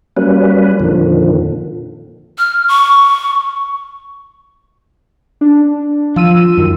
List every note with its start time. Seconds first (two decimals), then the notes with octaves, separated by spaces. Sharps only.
0.16 F#3 G3 A#3 C#4 B4
0.80 F2 A#2 D3 D#3 F3
2.38 F6
2.68 C#6
5.41 D4
6.16 F3 F4 E6 D#7
6.57 F#2 D#3